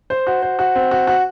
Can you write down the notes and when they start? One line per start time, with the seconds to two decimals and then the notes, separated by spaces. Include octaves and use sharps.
0.10 C5
0.27 F#4
0.42 C5
0.59 F#4
0.75 C4
0.91 F#4
1.07 F#4